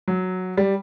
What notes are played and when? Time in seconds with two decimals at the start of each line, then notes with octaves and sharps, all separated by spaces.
0.08 F#3
0.57 G3